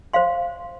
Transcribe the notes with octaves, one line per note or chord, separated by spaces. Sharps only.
C5 F5 C6